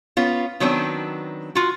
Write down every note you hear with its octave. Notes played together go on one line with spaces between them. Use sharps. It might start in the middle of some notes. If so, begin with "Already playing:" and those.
B3 C#4 F4
D#3 F#3 B3 C4 D4
F4 F#4